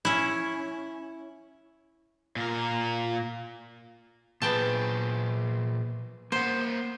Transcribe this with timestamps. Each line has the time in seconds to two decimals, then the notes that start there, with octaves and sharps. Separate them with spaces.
0.05 C#4 E4
2.36 A#2 A#4
4.42 A#2 B3 G#4 G5 A5
6.32 A#3 C5 F#5